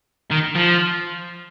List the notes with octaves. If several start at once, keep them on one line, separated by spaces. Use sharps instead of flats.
D#3
F3